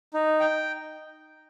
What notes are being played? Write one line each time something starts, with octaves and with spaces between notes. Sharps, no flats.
D#4
G5